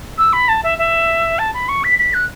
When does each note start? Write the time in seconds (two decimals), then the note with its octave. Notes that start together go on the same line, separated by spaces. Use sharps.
0.18 E6
0.33 B5
0.49 A5
0.63 E5
0.79 E5
1.39 A5
1.54 B5
1.69 C#6
1.84 B6
1.99 B6
2.14 F#6